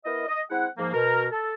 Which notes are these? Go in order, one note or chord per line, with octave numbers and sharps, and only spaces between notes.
B3 E4 A#4 D#5
D#5
G#3 C4 E4 F#5
G#2 F3 A#3
B2 A#4
A4